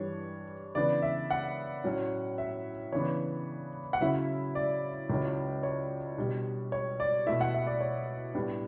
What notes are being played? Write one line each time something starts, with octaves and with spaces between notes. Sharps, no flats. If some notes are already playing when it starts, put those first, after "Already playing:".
Already playing: G2 E3 G3 D4 C#5
C#3 E3 B3 D4 D5
E5
F#5
A2 F#3 C#4
E5
C#3 E3 B3 D4 C#5
F#5
C#3 F#3 C#4 E4 E5
D5
C#2 C#3 F#3 C#4 E4
C#5
B2 G3 D4
C#5
D5
B2 A3 E4 E5
F#5
E5
D5
C#5
A2 G3 B3 D4